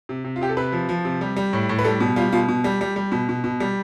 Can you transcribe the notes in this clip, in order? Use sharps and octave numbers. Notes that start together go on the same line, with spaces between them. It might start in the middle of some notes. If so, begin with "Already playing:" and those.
C3
C3
F4
C3 G4
A4
C3 B4
F3
F3
C3
G3
G3
A2
A2
B4
G3 A4
B2
G3 F4
B2 F4
B2
G3
G3
G3
B2
B2
B2
G3